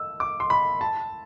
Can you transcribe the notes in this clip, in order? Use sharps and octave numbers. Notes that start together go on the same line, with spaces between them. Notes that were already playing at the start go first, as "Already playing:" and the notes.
Already playing: E6
D6
C6
B5
A5